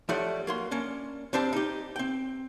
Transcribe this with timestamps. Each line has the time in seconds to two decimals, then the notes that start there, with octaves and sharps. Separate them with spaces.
0.09 F3 G3 A3 C#5 F#5
0.47 F#3 A#3 C6
0.71 A#3 C#4 D4
1.33 G2 C4 D4 C5 A5
1.53 D#4 G4
1.96 C4 G5